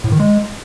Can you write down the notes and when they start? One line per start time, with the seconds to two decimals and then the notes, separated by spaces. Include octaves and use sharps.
0.04 A2
0.12 D#3
0.20 G#3